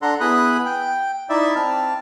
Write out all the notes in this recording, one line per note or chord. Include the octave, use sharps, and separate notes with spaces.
D4 A4 F#5 A#5 C6
B3 E4 G#4 B5 D#6 F#6
G5
D#4 E4 D5 E5
C4 A5 F6